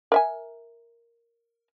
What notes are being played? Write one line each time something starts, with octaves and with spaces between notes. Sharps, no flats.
A#4 E5 G#5